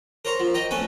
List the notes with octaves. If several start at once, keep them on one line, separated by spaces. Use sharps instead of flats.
A#4 C5 C#5 A#5
F3
D#5 G5 A#5
A3 C#4 B4 G#5